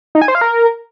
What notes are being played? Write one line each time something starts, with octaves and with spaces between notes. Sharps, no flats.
D#4
G#5
C5
F5
A#4